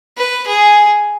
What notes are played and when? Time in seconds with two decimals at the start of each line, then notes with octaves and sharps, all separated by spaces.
0.17 B4
0.47 G#4